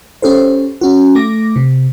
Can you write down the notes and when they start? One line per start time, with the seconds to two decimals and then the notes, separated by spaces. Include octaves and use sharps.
0.22 C#4 G4 A4 C5
0.81 C#4 F#4
1.15 A3 D6 A#6
1.56 C3